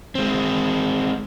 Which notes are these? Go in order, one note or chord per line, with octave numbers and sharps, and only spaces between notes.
G#3 C4